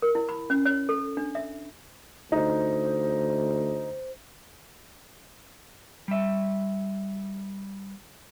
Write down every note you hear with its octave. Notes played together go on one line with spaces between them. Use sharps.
A#4
E4
B5
C#4
C#5
A4
D4
E5
D2 D#4 C5
G3 E5